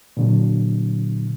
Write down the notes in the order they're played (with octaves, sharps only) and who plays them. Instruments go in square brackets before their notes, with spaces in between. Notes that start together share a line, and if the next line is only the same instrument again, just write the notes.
[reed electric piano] A#2 D3 F#3